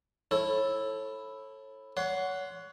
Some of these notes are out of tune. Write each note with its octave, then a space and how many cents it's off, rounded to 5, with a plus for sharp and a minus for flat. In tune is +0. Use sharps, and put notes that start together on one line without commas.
E4 +0 A4 +0 C#5 -30
C#5 +30 F#5 +0 C6 +0